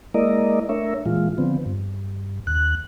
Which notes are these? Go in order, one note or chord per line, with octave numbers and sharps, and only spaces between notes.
G#3 A#3 E4 A#4 D5 D#5
A3 D4 A#4 C#5 E5
A#2 E3 G#3 F4
D3 F3 B3 C4
G2
D#2 F#6